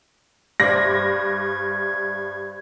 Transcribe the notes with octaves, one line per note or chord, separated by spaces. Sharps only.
G2 C5 D5 E5 G#6 A#6